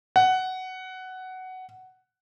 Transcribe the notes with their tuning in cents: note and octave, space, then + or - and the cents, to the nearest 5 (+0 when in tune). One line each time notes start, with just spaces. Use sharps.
F#5 +10